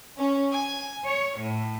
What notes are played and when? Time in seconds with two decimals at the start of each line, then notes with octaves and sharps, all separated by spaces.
0.18 C#4
0.53 G#5
1.04 C#5
1.38 A2